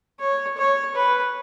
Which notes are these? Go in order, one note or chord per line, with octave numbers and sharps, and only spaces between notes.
C#5
C#5
B4